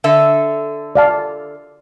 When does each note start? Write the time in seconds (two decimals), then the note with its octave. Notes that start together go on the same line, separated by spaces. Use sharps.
0.04 D3 A4 E5
0.95 D5 F5 A5